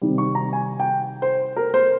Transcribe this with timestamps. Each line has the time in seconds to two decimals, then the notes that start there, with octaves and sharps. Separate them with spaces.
0.02 C3 D#3 G3
0.18 C#6
0.35 A#5
0.53 G#5
0.80 G5
1.22 C5
1.56 A#4
1.74 C5